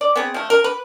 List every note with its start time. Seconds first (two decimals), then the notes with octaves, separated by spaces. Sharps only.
0.01 D5
0.16 B3 C4 G#4
0.34 F3 A3
0.50 A#4
0.64 B4